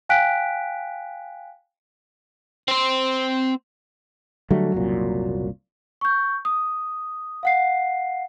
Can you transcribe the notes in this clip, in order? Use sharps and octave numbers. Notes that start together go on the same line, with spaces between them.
F5 G5 G#5 F#6 B6 D7
C4 C5
D3 F#3 G3 A3
F#1 C2 A#2
C#6 G6
D#6
F5 F#5 C7